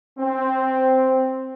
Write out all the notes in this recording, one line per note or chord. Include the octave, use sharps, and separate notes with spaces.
C4